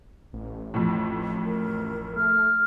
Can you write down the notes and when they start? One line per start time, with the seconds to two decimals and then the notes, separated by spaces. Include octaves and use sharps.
0.33 A1
0.74 F2 A2
1.45 A#4
2.16 A3 F6